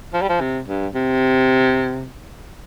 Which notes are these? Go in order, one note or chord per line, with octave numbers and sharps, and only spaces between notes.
F3
G3
F3
C3
G2
C3